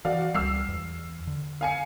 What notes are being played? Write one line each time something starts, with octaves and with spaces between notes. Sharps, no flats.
E3 F#4 D5 F5
C#2 G3 E6 F6 C7
E2
D3
F5 G#5 C#7